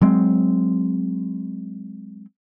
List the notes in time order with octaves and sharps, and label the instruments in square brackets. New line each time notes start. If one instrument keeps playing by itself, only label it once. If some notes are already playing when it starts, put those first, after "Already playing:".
[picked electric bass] F#3 G#3 C4